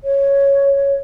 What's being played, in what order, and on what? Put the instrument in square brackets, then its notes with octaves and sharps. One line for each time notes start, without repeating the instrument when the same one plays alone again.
[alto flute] C#5